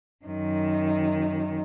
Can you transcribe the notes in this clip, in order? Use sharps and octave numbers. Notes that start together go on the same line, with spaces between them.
F#2 D#3